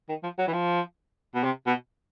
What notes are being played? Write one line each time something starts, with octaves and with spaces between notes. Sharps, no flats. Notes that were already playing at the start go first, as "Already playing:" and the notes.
D#3
F3
F#3
E3
F3
B2
C3
B2